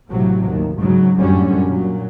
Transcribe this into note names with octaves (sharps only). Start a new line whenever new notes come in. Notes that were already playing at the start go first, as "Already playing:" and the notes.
A1 A2 C3 F3 F#3
D#2
G#2 C#3 F#3
F#2 A2 D3 G3 C#4
A#2 F#3